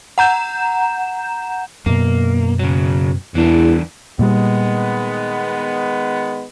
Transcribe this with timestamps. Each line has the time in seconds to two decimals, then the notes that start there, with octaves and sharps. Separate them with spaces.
0.18 F#5 A#5 G6 E7
1.86 F#2 B2 A#3
2.59 C#3 F#3
3.35 E2 E3 D4
4.19 A#2 D#3 G3 G#3 B3